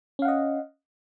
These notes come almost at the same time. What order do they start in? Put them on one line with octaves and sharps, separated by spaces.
C#4 F5 F#5 D#5